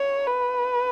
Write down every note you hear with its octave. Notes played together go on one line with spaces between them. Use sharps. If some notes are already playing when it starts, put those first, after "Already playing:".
Already playing: C#5
B4